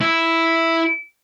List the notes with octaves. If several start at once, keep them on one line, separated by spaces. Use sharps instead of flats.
E4